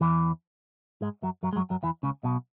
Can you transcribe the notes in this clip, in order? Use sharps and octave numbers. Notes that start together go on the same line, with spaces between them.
E2 E3
G#2 G#3
F#2 F#3
F#2 F#3
G#3
F#2 F#3
F#2 F#3
E2 E3
C#2 C#3
B1 B2